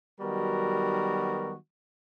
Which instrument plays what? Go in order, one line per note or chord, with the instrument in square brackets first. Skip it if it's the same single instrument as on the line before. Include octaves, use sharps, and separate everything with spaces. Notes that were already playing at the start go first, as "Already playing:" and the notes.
[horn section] D#3 F#3 G3 B3 F#4 A#4